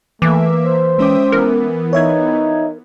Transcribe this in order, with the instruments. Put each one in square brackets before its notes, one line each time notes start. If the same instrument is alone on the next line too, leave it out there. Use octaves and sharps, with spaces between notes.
[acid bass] E3 [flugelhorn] A3 [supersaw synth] A#3 E5 [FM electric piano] D6
[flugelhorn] C5
[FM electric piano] G#3 C#4 D6 [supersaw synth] E5 G5 D#6
[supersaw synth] E3 B3 [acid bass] A#4
[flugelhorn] D#4 [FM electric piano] C#5 E5 G#6